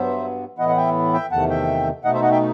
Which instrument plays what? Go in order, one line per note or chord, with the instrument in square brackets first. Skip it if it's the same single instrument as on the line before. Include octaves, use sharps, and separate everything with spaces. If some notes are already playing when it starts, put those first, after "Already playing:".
Already playing: [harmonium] G2 F#3 B3 C5 E5
A2 E3 B3 E4 D#5 F#5
F#5
E5 G5
E5 G5
E2 C3 D#3 A3 F#5 A5
E5 G5
B2 A3 D#4 D#5 F#5
C5 E5
D#5 F#5
E5 G5